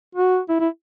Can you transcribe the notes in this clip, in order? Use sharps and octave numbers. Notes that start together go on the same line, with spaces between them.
F#4
E4
E4